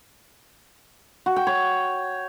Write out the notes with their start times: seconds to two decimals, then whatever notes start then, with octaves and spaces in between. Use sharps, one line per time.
1.26 F#4
1.36 G5
1.47 C#5